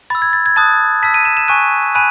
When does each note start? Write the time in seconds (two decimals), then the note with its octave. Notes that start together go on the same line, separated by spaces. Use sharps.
0.10 B5 E6 A6
0.22 G#6
0.33 A6
0.46 G#6
0.56 A5 D#6 F#6 A6
1.03 A5 E6 B6
1.14 D#7
1.25 E7
1.37 E7
1.48 G#5 C#6 F#6 D#7
1.95 G#5 B5 F#6 D#7